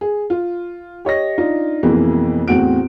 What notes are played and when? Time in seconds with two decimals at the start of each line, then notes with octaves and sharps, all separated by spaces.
0.01 G#4
0.30 F4
1.05 G4 C#5 D#5 A#6
1.38 D4 D#4 F4
1.83 F2 B2 E3 G#3 A#3
2.48 E2 A2 C4 F#4 D7